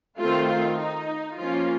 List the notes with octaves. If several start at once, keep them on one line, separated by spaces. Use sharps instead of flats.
D#3 A3 C4 F4
F4
D#4
F3 A#3 C#4 F4